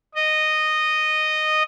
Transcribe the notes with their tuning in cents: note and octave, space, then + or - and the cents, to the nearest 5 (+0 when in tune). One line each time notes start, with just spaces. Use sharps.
D#5 -10